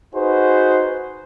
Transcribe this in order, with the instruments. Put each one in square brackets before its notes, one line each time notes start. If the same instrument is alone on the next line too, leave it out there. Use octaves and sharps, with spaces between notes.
[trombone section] D#4 F#4 G#4 B4 C5